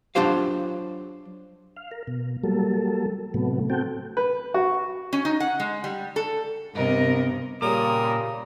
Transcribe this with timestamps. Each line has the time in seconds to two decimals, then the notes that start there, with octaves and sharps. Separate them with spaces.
0.15 F#3 D4 F4 G4 C5 F5
1.77 F5
1.91 A#4
2.07 B2
2.43 F#3 G3 A#3 A4
3.34 A2 C3 F#3 A3 B3
3.70 C4 F#4 A4 G5
4.17 B4
4.54 F#4
5.13 C#4
5.25 D#4
5.40 F#5
5.60 G#3
5.84 G3
6.16 A4
6.75 G2 C3 B3 A#4 D#5
7.62 A#2 C#3 G3 A#4 D#6